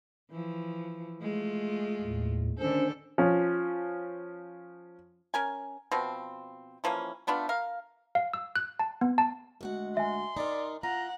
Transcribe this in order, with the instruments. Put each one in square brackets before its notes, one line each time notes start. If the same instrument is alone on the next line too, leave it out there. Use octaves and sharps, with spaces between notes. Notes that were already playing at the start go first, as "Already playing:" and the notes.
[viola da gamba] E3 F3
G#3 A3 F4
[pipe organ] D#2 A2
[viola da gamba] D3 D#3 A4 [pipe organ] C#4 D4 C5
[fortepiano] F3 C#4
[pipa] C#4 A#4 G#5
B2 F3 C4
E3 F3 A#3 C#4
A3 B3 D4 F4
A#4 F5
[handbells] F5
E6
F#6
A5
B3
A5
[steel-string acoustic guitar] D2 F#4 F#5 [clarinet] G#3
[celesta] E5 G#5 [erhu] C6
[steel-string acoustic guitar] D#4 A#4 [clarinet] D5
[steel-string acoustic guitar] F4 [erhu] F#5 [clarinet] A#5